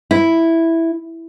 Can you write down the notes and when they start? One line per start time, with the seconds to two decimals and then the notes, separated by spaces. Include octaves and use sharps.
0.11 E4